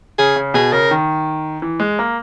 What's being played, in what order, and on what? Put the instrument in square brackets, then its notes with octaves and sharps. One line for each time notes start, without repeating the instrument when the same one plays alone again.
[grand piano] C#3 [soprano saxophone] G#4
[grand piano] C#3
[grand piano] B2 [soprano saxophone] G#4
[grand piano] C#3 [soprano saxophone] A#4
[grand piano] D#3
E3
G#3
A#3